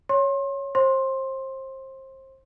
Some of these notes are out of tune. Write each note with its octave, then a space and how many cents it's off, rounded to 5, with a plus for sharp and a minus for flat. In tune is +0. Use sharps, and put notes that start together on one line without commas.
C#5 +0 C6 +35
C5 +30 C6 +15